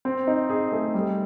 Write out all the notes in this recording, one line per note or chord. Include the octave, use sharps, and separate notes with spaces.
C4
D#4
G#4
A3
G3